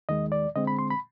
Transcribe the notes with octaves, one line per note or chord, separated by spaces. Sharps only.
D#2 D#3 G#3 D#5
D5
D3 G#3 C4 D#5
B5
C6
B5